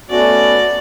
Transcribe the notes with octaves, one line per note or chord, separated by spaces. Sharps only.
A3 B3 C#4 F#4 D5